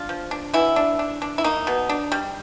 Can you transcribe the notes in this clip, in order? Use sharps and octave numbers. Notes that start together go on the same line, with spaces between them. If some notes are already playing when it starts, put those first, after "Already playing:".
Already playing: D4 F4
F3
D4
B2 E3 E4
D4
D4
D4
E4
A#3 D#4
B2
D4
G3